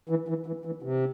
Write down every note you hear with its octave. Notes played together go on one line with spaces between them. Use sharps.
E3
E3
E3
E3
C3